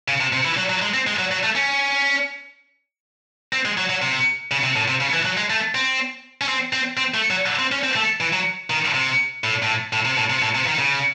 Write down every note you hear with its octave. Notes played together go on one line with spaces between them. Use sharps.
C#3
C3
C3
E3
F#3
F#3
G#3
C4
G#3
F#3
F#3
A3
C#4
C4
G#3
F#3
F#3
C3
C#3
C3
A2
C3
C#3
E3
F#3
G#3
A3
C4
C#4
C4
C4
C4
A3
F#3
C4
C#4
C4
A3
E3
F#3
D#3
C3
A2
A2
A2
C3
A2
C3
A2
C3
D#3
C#3